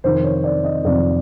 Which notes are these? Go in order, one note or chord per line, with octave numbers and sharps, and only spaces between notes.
F2 C3 D#3 C5
C#5
D5
D#5
F2 C3 D#3 D5